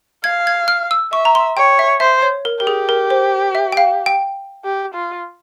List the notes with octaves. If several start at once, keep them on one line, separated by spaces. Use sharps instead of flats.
F5 G#6
G#6
F6
E6
E5 C#6
A#5
C6
C#5 G5
E5
C5 E5
C#5
A#4
G4 A#4
G#4
A#4
C5
E5
G5
F5
G5
G4
F4